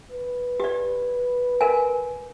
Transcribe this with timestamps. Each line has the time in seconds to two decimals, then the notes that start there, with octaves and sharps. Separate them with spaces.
0.11 B4
0.60 G4 D5
1.61 A#4 G#5